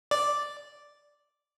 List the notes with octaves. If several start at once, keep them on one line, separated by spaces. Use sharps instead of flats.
D5